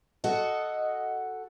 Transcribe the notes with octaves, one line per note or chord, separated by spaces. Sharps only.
F#4 A4 D#5 F#5